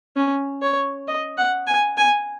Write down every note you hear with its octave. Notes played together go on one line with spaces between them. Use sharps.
C#4
C#5
D#5
F#5
G#5
G#5